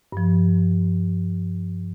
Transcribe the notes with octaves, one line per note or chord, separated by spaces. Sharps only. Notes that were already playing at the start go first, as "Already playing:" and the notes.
G2 F3